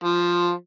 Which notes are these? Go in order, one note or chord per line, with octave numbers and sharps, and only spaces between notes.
F3